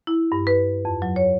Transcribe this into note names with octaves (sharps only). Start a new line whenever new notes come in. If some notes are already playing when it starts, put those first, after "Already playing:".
E4
G2
B4
F2
F#3
C#5